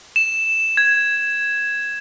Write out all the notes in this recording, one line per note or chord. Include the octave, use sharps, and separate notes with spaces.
E7
G#6